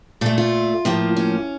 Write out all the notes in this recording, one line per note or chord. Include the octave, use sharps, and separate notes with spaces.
A#2 A3 A4
F4
A2 F3 A#3
C#4